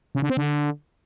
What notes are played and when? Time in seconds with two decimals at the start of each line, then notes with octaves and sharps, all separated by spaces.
0.15 C#3
0.22 D3
0.30 C4
0.37 D3